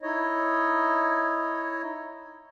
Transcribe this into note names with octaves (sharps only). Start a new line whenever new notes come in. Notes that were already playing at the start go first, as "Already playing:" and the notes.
D#4 E4 C#5 D#5